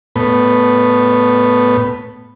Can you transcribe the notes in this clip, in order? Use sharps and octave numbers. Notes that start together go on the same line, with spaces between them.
A2 B3